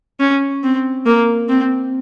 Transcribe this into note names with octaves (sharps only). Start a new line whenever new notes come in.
C#4
C4
A#3
C4